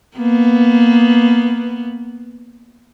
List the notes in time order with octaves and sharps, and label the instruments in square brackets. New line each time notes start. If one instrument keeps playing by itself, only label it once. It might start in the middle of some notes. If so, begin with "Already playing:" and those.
[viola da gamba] A#3 B3